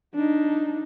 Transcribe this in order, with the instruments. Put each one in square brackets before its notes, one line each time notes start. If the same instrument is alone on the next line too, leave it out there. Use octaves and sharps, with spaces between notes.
[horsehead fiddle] D4 D#4